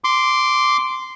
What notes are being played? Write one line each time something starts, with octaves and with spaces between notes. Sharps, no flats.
C6 D6